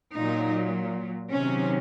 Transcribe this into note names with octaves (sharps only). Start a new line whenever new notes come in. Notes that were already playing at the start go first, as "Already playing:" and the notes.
A#2 F#3 D#4
C3 D#3 F#3 C#4